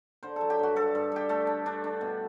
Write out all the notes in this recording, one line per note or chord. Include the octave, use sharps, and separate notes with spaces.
D3 C5
F#3 A4
G4
G2 F#4
G2 A4
G2
G2 G4
A3 A4
D4
D4
D4
B2